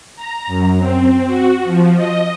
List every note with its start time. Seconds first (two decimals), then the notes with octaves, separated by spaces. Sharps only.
0.16 A#5
0.47 F#2
0.79 C4
1.27 F#4
1.65 F3
1.96 D#5